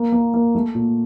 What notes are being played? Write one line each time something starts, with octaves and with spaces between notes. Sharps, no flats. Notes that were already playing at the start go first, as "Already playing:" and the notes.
Already playing: A#3
A#3
A#3
A3
A#2